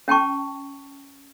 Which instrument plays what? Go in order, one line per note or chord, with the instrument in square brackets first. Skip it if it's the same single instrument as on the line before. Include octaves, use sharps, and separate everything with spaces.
[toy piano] C#4 G5 A5 C#6